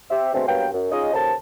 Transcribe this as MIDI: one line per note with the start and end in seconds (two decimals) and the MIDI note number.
0.11 0.31 60
0.11 0.31 67
0.11 0.31 76
0.34 0.44 47
0.34 0.44 50
0.34 0.44 56
0.34 0.44 57
0.34 0.44 60
0.47 0.68 43
0.47 0.68 54
0.47 0.68 58
0.47 0.68 59
0.47 0.68 77
0.47 0.68 79
0.73 0.88 42
0.92 1.11 61
0.92 1.11 63
0.92 1.11 65
0.92 1.11 68
0.92 1.11 75
1.14 1.34 39
1.14 1.34 49
1.14 1.34 69
1.14 1.34 72
1.14 1.34 81